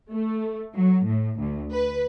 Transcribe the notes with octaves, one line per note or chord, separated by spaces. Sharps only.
A3
F#3
A2
D2
B4